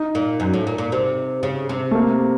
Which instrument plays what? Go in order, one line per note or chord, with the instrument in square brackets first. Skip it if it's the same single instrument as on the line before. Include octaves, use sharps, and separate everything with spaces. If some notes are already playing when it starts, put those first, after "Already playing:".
Already playing: [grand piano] D#4
[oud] A#2
F#2
A2
A#2
A#2
C3
C#3
C3
[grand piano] A3
A#3